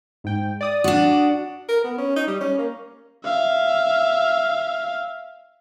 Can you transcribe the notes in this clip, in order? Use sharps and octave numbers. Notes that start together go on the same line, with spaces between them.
G#2 G5
D5 D#6
D4 F#4
A#4
B3
C#4
D#4
G3
C#4
A#3
E5 F5